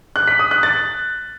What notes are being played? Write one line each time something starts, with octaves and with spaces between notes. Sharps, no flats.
F#6
B6
D#6
F#6
A6